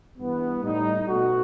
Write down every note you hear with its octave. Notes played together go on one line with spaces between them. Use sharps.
G2 E3 G3 B3
A2 G3 D#4
B2 A3 F#4